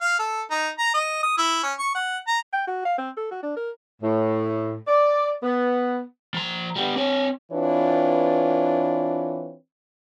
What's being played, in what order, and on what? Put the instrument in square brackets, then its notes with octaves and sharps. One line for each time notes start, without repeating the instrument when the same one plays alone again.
[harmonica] F5
A4
D#4
A#5
D#5
D#6
E4
C#4
C#6
F#5
A#5
[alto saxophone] G5
F#4
F5
C4
A4
F#4
D4
A#4
[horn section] A2
D5
B3
[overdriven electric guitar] F3 A#5
G3 B3
C4 C#5
[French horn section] E3 C4 D4 F4 B4 C#5